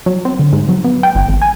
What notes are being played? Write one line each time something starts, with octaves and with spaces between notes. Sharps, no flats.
F#3
C4
D3
G#2
F#3
B3
G5
G1
G#1
G#5